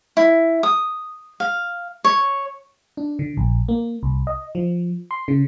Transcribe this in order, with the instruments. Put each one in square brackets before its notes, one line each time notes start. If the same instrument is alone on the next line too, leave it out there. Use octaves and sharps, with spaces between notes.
[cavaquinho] E4
D#6
F5
C#5
[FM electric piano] D4
D3
A#1
A#3
C2
D#5
F3
C6
C#3